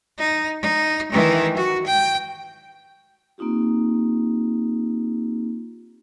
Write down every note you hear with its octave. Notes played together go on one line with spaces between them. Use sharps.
D#4
D#4
D#3 E3
F#4
G5
A#3 C4 D#4 F4 G4